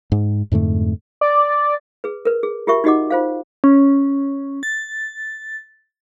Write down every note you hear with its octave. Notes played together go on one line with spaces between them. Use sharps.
G#2
F2 G#2 D3 A3
D5
G#4 B4
A#4 B4
G#4
F4 G4 A#4 E5 C#6
D#4 F#4 G4 D#5 F#5 D6
F4 C5 F5
C#4
A6